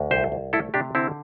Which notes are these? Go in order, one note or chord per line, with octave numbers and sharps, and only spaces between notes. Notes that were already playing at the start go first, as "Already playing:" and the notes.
Already playing: D2
C2 G4 C5
C2
A3 E4 A4
C3 D4 G4
D3 C4 E4